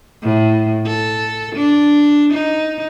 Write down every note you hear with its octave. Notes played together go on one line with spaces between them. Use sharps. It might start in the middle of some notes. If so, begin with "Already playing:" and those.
A2
A4
D4
D#4